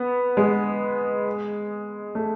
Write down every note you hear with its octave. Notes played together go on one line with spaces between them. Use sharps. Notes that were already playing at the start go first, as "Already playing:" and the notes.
Already playing: B3
G#3
A3